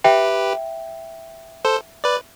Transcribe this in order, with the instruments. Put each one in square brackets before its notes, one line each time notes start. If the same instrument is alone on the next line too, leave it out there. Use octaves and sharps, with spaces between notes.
[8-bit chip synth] G4 B4 [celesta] E5 G5
[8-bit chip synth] A4 C5
B4 D5